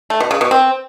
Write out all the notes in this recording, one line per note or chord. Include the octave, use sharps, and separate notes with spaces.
A3
B2
C#3
B2
C4